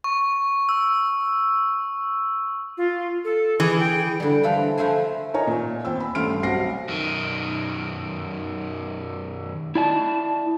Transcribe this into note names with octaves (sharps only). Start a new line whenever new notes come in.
C#6
E6
F4
A4
E3 G#4
G5
D3 G3
E3 F4 A4 B4 C5
F3 A3 E4 C5 G#5
D#4 A#4 C#5 G#5 A#5
A#2
E2 C4 G5 E6
B5
A1 G2 A3 C6 F6 D7
B1 C4 F#5 A#6 C7
F#2 D#3
E4 D5 A5